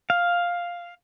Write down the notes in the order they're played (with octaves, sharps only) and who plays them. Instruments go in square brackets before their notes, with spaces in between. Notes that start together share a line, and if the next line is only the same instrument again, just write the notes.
[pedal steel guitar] F5